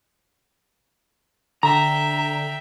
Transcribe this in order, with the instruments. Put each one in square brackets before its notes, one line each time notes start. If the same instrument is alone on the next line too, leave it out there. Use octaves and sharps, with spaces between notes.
[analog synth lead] D3 [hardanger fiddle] E5 G5 [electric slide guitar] A#5